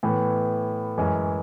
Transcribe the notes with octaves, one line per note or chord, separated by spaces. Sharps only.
A2 E3 B3
F#2 E3 G#3 C#4